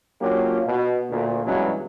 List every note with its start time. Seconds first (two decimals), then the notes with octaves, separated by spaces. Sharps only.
0.22 F#3 A#3 C#4 D4 F4 G4
0.67 B2
1.10 D2 A#2
1.46 G2 B2 E3 F#3 G#3 C#4